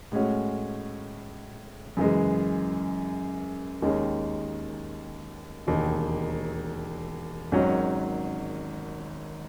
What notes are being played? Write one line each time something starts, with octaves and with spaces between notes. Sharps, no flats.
A2 G#3 C#4 F#4
F#2 C#3 E3 G#3
D#2 D#3 G#3 C#4
E1 D#2 D#3
G#1 G#2 D#3 F#3 C#4